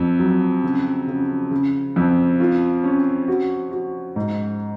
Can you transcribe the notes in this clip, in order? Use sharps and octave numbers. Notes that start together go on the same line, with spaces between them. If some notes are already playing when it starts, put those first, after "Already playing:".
Already playing: F2
F#3
C#3
C#3
C#3
F2
F4
C#4
F#4
F#4
G#2